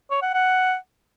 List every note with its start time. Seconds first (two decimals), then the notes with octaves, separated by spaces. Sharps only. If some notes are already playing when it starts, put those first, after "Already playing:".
0.11 C#5
0.22 F#5
0.33 F#5